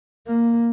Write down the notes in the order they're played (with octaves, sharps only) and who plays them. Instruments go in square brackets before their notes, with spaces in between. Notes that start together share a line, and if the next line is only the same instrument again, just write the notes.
[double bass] A#3